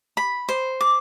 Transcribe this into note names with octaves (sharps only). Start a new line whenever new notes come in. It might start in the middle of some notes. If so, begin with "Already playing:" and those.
B5
C5
D6